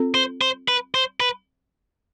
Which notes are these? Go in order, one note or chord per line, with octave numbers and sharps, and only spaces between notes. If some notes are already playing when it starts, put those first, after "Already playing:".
Already playing: C4 F4 A4
C5
C5
B4
C5
B4